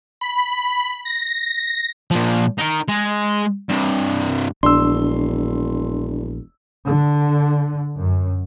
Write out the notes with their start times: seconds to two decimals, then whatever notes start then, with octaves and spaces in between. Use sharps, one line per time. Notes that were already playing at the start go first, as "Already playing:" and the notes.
0.21 B5
1.05 A#6
2.11 A#2 F3
2.59 D#4 A#4
2.89 G#3
3.69 G2 C3
4.63 E1 A#1 D4 C6 E6
6.85 D3
7.98 F#2